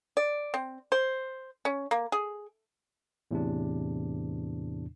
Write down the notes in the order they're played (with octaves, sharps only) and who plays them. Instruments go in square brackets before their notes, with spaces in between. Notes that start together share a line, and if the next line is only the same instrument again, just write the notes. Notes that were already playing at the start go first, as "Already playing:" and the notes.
[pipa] D5
C4
C5
C#4
A#3
G#4
[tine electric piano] E2 A2 C3 E3 D4